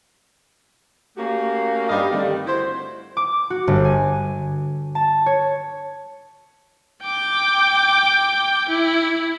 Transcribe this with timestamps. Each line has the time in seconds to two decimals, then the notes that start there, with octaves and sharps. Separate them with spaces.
1.17 A3 A#3 C#4 F#4 G4
1.89 G2 G3 G4 D#5 F5
2.12 D3 D#3 G3 A3 C4
2.47 E4 F#4 C5
3.17 D6
3.50 F#4
3.67 G1
3.85 G#5
4.95 A5
5.26 C#5
7.04 G5 D6
8.69 E4